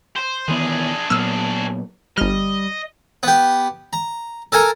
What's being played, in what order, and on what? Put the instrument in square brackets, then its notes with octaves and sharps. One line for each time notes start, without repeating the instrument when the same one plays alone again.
[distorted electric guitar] C5
[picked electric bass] D#3 E3 B3 [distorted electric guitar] D4 G#4
[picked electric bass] A#2 F#3 B3 [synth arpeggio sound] E6 F6
[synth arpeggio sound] G1 F6 [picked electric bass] G3 [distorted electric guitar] D#5
[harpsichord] B3 G4
A#5
A4 A#4 G#5 A#5